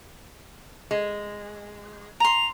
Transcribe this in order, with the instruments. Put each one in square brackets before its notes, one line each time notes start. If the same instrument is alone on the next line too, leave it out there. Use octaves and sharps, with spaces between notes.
[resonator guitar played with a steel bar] G#3
[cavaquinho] A#5 C6 [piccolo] F7